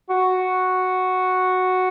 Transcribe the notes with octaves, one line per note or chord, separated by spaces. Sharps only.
F#4